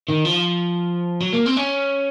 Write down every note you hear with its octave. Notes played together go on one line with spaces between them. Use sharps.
D#3
F3
F#3
A#3
C4
C#4